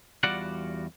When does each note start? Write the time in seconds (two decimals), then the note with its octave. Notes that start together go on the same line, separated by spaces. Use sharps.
0.23 E2 G3 F4 F#4 D5 F#5